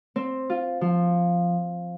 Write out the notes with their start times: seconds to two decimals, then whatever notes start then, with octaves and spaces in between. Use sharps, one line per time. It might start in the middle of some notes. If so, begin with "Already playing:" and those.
0.16 C4
0.50 F4
0.81 F3